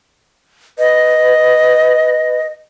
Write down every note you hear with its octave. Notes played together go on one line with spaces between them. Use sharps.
B4 D#5